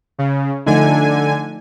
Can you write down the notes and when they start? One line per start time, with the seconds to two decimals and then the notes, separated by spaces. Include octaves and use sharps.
0.19 C#3
0.66 D3 F3 A3 D#4 G#5